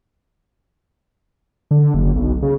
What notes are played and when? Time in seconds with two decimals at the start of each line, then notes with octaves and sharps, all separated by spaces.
1.71 D3
1.94 F#1
2.16 B1
2.42 C#3